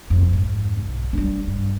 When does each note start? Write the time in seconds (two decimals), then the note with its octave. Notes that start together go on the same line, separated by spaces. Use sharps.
0.10 F2
0.33 G#2
0.77 B1
1.13 G3 D4
1.47 G2